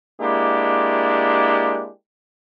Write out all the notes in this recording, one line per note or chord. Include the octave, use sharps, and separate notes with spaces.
G#3 A#3 D4 E4 G4